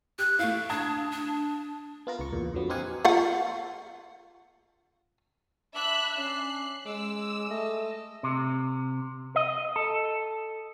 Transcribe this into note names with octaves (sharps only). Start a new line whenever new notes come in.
G4 F#6
A3 E4 F5
D4 A5 D#6 G#6
D4
B3 F4 A#4
C#2 C#6
E2 A#2
F2 D3 F#3 B3
C4 D#4 G4 F5 F#5 G#5
F4 F5 F#5
D4 E5 B5 F#6
C#4 F#6 C7
G#3 D6 E6
A3 D#5
C3
D#5
A4